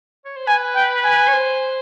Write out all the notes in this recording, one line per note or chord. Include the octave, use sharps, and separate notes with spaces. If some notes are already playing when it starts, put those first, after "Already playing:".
C#5
C5
B4 G#5
G5
G#5
C#5
C5